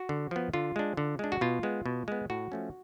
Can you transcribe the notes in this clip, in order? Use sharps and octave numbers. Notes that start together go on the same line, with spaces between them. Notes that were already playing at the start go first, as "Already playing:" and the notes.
Already playing: F#4
D3
F3 B3
D3 F4
G#3 D4
D3
G#3 D4
F#4
B2 F4
G#3 B3
B2
G#3 B3
A2 F#4
F3 A3 C#4